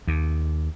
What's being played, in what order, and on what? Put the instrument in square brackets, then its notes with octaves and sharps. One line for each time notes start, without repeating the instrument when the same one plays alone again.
[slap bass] D#2